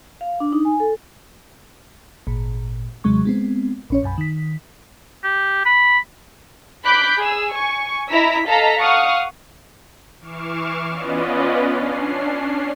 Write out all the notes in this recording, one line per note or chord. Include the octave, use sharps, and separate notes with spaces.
F5
D4
D#4
G#5
A4
G#1 A#2
D#2 C3 F#3 G#3 C#6
G#3 B3 C4
A#1 C#4 C#5
B1 F#2 G#5 B5
D#3 B6
G4
B5
B5 D6 F#6 G6 B6
G#4 E6
G#5 C#6
E4 D#5 A#5 E6 B6
A4 D#5 F5 A5 A#5 B6
F5 F#5 C#6 D#6 F6
E3 C#6 D6 F6 C7 E7
B3 C#4 F4 B4 D5 D#5
C#4 D4 C7